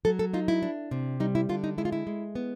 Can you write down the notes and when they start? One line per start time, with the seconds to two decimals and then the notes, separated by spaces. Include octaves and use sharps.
0.05 F#3 A4
0.19 A4
0.34 D#4 F4
0.48 E4
0.63 D4
0.91 C3
1.20 G3 D#4
1.35 E4
1.49 D3 F4
1.64 D#4
1.78 G#3 E4
1.85 F4
1.92 E4
2.07 G#3
2.35 B3